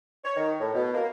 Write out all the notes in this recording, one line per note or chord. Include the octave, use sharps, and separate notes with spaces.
C#5
D#3
A2
B2
A#3